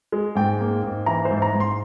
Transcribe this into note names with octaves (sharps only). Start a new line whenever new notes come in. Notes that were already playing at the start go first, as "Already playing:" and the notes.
G#3
G#2 G5
A#3
G#2
E3 A#5
C5
G#2
A#5
G#2
C6